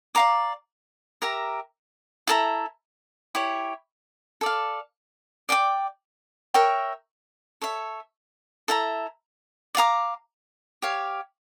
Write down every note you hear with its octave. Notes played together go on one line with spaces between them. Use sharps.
D5 F5 A#5 D6
G4 A#4 E5 A#5
E4 A4 E5 A#5
E4 G4 C#5
A4 D5 F5
D5 G5 D6
A#4 C#5 E5 G5
A4 C#5 E5
E4 A4 E5 A#5
D5 F5 A#5 D6
G4 C#5 F5